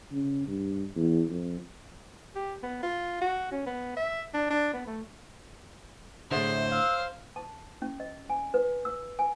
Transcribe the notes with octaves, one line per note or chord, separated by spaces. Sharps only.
C#3
G2
E2
F2
G4
B3
F4
F#4
C#4
B3
E5
D4
D4
B3
A3
A2 D3 G#4 C5 E5
F5 E6
A5
C#4
D#5
G#5
B4
E6
G#5